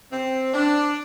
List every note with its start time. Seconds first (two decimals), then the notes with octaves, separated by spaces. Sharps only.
0.12 C4
0.53 D4